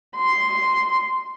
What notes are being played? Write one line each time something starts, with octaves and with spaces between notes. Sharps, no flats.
C6